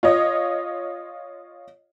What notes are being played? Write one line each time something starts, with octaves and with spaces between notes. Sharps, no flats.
F4 C#5 D#5